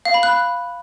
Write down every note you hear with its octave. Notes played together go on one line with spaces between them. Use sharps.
F5
B5
F#6